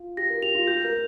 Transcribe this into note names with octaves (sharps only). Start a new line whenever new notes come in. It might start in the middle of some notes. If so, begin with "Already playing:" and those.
Already playing: F4
G4 A#6
A#4
G4 F7
F4
G4 G6
A#4